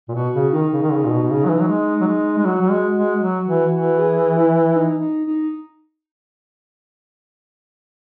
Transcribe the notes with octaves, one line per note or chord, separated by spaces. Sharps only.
A#2
B2 F#4
C#3
D#3 D#4
C#3
D#3
C#3
A#2
B2
B2
C#3
F#3
E3
F#3
G#3
F#3
G#3
G#3
F#3 F#4
F#3
G#3
G#3
F#3
E3
E3
G#4
E4
D#4
D#4
D#4